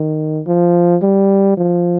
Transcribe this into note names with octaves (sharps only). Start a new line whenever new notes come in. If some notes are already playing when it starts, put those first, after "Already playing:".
Already playing: D#3
F3
G3
F3